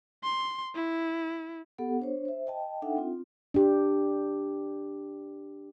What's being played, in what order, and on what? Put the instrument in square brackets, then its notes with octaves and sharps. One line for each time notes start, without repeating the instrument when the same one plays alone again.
[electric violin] C6
E4
[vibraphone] B3 G4 A4 F#5
D4 C5 C#5
C5 E5
D#5 G5 A5
D4 D#4 A4 E5 F#5 G5
C4 F4
[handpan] D4 G4